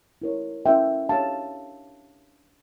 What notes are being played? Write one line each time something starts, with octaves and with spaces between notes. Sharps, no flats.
E4 A#4 C#5
C#4 E4 A#4 E5 G5
D4 G4 C#5 F5 A5